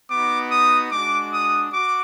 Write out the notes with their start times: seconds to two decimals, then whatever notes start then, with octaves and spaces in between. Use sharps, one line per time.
0.10 B3 D#4 F#4 D6
0.50 D#6
0.91 G#3 D4 F#4 D6
1.33 D#6
1.72 F#4 D6